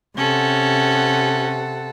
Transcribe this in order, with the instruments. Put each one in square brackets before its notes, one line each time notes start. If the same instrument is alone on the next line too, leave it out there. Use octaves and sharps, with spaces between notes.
[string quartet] C3 A4 F#5 [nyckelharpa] C#4